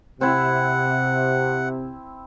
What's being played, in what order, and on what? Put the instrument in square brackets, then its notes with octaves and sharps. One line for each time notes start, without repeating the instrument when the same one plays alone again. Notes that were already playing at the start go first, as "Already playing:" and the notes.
[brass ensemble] C3 [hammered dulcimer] C4 E4 [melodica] F#5